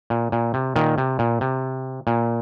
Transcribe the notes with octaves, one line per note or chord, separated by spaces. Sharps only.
A#2
A#2
C3
A#2 D#3
C3
A#2
C3
A#2